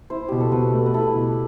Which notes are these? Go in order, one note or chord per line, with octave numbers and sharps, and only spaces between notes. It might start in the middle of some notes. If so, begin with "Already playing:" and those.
E4 C5
B2 G4
A4
B2 B4
A3
B4
E4 A4
B2